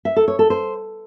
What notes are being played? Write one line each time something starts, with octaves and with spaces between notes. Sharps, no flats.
E5
A4
C#5
A4
C5